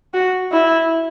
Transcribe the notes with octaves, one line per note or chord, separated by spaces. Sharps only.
F#4
E4